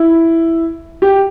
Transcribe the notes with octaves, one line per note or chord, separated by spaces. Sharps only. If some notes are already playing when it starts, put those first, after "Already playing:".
Already playing: E4
G4